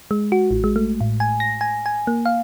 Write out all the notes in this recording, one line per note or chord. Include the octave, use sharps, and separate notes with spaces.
G#3
F#4
A1
G#3
A3
A2
G#5
A#6
G#5
G#5
A#3
F5